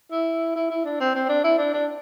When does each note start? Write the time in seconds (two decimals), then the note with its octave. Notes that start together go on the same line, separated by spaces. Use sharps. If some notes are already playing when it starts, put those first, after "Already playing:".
0.11 E4
0.56 E4
0.70 E4
0.85 D4
1.00 C4
1.15 C4
1.29 D4
1.44 E4
1.58 D4
1.73 D4